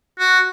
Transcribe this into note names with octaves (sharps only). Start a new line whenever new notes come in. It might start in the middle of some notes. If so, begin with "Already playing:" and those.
F#4